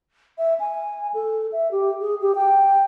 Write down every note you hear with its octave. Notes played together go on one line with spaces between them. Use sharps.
E5
G#5
A4
E5
G4
G#4
G4
G5